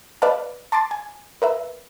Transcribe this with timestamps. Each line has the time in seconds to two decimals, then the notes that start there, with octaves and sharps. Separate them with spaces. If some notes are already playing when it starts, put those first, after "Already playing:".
0.22 B4 D5 D#5 F5 A5
0.72 A5 C6 D6 A6
0.91 G#5
1.42 A#4 B4 E5